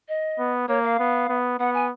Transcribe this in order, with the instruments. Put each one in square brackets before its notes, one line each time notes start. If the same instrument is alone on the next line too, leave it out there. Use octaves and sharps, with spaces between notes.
[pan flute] D#5
[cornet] B3
[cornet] A#3 [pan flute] C#5
[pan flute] F5
[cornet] B3
B3
[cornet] B3 [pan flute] F#5
[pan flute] G#5